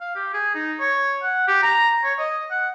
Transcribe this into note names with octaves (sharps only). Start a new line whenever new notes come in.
F5
G4
G#4
D#4
C#5
F#5
G4
A#5
C#5
D#5
F#5